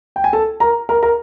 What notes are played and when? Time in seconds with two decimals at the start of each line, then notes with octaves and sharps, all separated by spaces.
0.16 G5
0.24 G#5
0.33 A4 A5
0.60 A#4 A#5
0.89 A#4 A#5
1.03 A#4 A#5